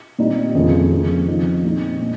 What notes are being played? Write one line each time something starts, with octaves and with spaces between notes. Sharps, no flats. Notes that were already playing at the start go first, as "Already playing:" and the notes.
A#2 G3 C4 D#4
F2 C#3 F3 A#3
C#3 F3 C4
C#3 F3 C4 D#4
A#2 G#3 C4 D#4
A#2